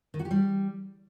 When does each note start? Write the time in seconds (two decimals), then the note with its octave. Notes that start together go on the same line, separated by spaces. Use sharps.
0.14 D#3
0.19 F#4
0.25 G4
0.31 G3